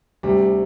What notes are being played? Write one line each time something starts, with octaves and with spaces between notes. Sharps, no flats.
D2 C3 G3